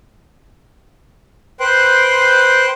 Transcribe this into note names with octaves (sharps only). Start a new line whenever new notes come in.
B4 C5 G5 C6 F#6